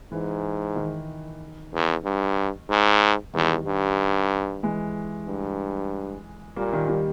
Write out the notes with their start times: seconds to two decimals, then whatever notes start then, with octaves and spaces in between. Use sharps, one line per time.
0.12 G#2 E3
0.76 D#3
1.73 E2
2.05 G2
2.69 G#2
3.34 E2 D#3 G3
3.66 G2
4.63 E3 G#3
5.27 G2
6.56 A#2 G3 A#3
6.73 D#3 G3
6.88 D#3 G3